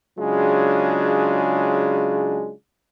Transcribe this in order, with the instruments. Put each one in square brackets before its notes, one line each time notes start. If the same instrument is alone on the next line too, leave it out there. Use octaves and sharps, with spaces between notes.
[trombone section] C#3 F#3 G#3 D4 F4 G#4